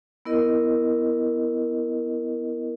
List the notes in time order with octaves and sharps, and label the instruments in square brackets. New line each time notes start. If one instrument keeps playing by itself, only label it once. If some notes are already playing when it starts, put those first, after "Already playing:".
[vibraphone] B3 E4 A#4 D#5